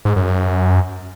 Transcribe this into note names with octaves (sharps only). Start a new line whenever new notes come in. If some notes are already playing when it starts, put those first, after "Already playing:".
G#2
F#2
F#2